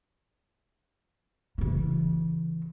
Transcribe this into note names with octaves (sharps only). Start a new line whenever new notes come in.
C#3 E3